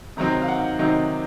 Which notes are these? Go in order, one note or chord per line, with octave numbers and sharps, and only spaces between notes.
C3 D#3 F#3 C4 D#4 A#5
F5
F#5
C3 D#3 F#3 C4 D#4